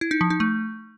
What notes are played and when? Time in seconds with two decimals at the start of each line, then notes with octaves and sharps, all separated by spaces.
0.01 E4
0.11 D#4
0.21 F3
0.30 D#4
0.40 A3